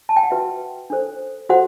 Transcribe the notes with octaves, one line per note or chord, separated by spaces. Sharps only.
A5
G5
F#5
F#4 B4 E5
D4 A4 C5
F#4 A4 C5 F#5